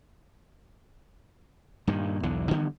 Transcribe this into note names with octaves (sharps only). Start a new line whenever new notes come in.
G2 A#2 D#3
B1 E2 D3
D3 E3 G3 B3